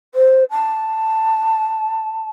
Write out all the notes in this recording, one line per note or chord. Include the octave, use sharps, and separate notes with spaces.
C5
A5